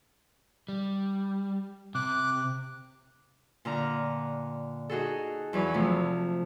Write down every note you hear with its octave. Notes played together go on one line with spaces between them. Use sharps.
G3
C3 D6 F#6
A#2 D3 A#5 F6
D#4 F#4 G#4 A4
E2 E3 F#3 C#5 B5
C3 F3 A3